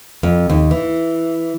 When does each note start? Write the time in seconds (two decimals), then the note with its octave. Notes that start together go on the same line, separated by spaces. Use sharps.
0.23 F2
0.50 D#2
0.71 E3